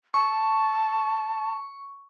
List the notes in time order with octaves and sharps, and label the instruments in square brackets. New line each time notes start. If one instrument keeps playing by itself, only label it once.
[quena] A5 [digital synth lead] C#6